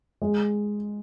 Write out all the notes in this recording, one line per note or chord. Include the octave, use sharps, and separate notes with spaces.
G#3